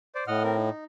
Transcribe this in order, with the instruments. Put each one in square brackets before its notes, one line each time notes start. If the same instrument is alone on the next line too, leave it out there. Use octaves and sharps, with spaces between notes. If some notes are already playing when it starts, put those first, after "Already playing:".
[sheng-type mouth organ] C5 D5
[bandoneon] A2 [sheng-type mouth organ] D#5 F#5 F6
[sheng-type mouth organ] C4 A#4
D#4